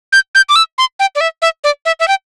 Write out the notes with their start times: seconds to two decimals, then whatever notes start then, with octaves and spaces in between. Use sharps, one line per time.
0.13 G6
0.35 G6
0.49 D6
0.56 E6
0.78 C6
1.00 G5
1.15 D5
1.21 E5
1.42 E5
1.64 D5
1.85 E5
2.00 E5
2.08 G5